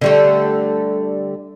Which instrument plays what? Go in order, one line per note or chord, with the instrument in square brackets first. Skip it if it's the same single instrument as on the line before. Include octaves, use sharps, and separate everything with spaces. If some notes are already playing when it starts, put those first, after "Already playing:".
[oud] D3 G3 A3